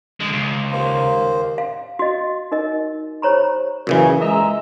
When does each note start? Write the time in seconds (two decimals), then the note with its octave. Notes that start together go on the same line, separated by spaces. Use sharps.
0.20 D3 G#3
0.33 C#2
0.72 D#2 A#3 C5
1.58 F5
1.99 F#4 D#5
2.52 D#4 A#4 D#5
3.22 G4 C5 C#5 A#5 B5
3.87 F#2 A#2 C#3 E3
4.21 G#3 D#5 E5 A#5